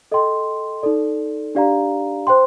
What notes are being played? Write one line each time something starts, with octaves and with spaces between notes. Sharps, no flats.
A4 D#5 G5 C6
D#4 A4 D5
D4 G4 D5 F5 A#5
C5 G5 C6